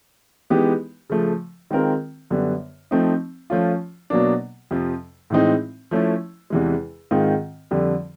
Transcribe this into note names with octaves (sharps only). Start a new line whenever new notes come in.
E3 G#3 B3 D#4 G4
C#3 F3 A3
D#3 G#3 C4 F4 A#4
F#2 D3 G3 B3
F3 A3 C4 D#4
F3 A3 C#4 F4
B2 F#3 A#3 D4
F2 C3 F3
A2 E3 G#3 C4 D#4
F3 A3 C#4 E4
E2 C3 E3 G#3
G#2 D#3 G#3 C4 F4
F2 D3 G3